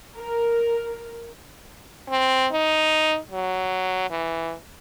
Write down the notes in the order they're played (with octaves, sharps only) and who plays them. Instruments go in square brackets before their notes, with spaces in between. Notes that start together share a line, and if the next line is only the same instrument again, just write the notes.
[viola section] A#4
[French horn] C4
D#4
F#3
E3